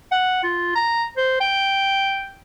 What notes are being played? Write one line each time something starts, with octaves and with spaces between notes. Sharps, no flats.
F#5
F4
A#5
C5
G5